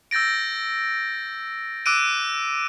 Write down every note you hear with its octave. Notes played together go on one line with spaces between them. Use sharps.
E6 G6 A6 A#6 D7
D6 E6 F#6 D7 D#7